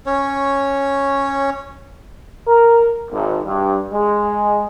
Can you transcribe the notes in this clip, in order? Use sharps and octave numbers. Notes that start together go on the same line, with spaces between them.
C#4 C#5
A#4
G#1
G2
G#3